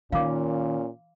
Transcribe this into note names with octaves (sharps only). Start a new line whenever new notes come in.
A#2 D#3 C#4 F5 B5 D6